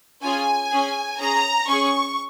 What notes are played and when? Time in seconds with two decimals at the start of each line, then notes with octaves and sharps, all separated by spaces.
0.22 C#4 F4 G#4 G#5
0.71 C#4 G#4
1.19 C#4 G#4 A#5
1.68 C#4 G#4 C#6